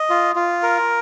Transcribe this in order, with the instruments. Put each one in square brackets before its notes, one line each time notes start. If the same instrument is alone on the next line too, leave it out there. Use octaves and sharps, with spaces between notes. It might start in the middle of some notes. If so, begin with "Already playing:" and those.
Already playing: [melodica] D#5
F4
F4
A#4